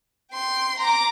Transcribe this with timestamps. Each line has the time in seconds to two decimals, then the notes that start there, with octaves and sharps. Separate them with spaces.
0.32 G5 C6
0.80 A#5 D6